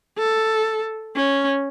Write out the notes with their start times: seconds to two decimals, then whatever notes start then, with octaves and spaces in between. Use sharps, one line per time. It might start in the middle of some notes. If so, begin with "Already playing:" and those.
0.18 A4
1.16 C#4